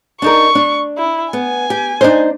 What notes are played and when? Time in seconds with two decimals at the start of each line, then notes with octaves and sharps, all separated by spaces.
0.22 D4 D#4 A#4 C#6
0.55 D4
0.97 E4
1.33 B3 G#5
1.70 G4
2.01 D4 D#4 C5